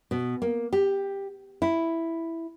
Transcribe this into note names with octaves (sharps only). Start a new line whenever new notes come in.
B2
A#3
G4
E4